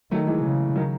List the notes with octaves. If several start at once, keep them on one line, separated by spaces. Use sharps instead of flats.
D#3 F#3 A3
E3 G#3
C#3
D#3 F#3